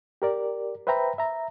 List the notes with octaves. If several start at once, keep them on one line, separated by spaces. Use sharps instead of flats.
G4 A#4 D5
B4 C5 E5 G5 A#5 B5
E5 A#5